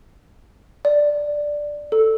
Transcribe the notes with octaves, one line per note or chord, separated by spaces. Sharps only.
D5
A4